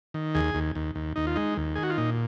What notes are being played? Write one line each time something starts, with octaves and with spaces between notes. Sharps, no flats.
D#3
D#2 G#4
D#2
D#2
D#2
D#2 D#4
F4
G#3 D#4
D#2
D#3 G#4
F#4
F4
A#2 D#4